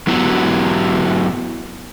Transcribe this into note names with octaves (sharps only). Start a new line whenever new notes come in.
F#3 B3 E4 F#4